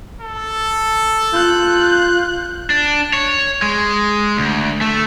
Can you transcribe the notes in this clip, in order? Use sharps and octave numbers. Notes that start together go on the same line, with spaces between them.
A4
F4 F#6 G6
D4
C#5
G#3
D2
A3